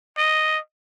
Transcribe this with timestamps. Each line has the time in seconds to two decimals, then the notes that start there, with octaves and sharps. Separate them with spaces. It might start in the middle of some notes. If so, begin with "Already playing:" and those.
0.17 D#5